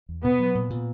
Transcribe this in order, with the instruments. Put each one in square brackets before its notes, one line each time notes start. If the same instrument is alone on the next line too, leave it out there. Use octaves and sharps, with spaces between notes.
[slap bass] E2
[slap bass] B2 [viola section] B3
[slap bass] F#3
A#2
A#2